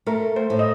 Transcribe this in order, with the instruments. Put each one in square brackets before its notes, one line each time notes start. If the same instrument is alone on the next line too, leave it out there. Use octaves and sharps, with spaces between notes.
[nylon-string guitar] A3 [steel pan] A#4
[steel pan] C5
[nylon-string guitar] A2
[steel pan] D#5